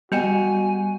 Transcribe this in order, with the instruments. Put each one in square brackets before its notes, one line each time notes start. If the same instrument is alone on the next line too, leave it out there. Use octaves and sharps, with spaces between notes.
[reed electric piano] G3 [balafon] B3 D#5 G5 [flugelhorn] F#4 [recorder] G#5